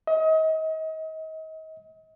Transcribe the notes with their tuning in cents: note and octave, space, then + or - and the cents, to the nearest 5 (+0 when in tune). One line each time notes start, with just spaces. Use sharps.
D#5 +35